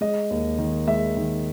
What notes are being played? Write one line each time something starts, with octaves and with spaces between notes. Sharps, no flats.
G#3 D#5
D#2
D#3
G#3 E5
D#3